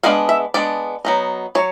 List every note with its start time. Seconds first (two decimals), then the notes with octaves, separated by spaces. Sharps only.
0.03 G#3 B3 D4 F5
0.29 E5
0.54 G#3 B3 D4 D5
1.05 F#3 B3 D#4
1.55 F#3 C#5